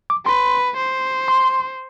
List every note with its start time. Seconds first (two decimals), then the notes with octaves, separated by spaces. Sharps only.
0.10 D6
0.26 B4 C6
0.77 C5
1.28 C6